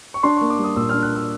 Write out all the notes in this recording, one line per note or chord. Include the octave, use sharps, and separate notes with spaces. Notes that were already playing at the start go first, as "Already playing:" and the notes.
C#6
D4 C6
A#3 C#6
D6
G3
D#6
A#2 E6
D4 F6
F#6
A#3 E6